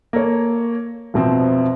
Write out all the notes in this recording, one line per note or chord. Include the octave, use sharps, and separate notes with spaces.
A#3 A4 C#5
F1 B2 F3 C4